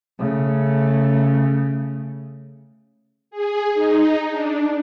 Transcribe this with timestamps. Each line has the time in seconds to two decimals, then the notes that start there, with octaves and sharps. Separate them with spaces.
0.19 C#3 A3
3.31 G#4
3.74 D#4
4.31 D4